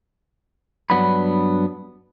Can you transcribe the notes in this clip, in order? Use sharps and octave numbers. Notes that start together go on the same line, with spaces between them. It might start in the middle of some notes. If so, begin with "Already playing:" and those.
G2 F#3 B3 D4 B4 B5